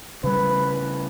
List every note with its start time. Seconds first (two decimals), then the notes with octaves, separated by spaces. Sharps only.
0.24 C#3 G3 B4